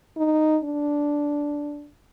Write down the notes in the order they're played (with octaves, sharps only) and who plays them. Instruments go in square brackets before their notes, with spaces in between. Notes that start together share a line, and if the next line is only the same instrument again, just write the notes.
[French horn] D#4
D4